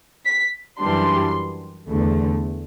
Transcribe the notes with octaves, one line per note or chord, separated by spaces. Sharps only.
B6
F#2 E3 G3 D4 C6
E2 D3 A3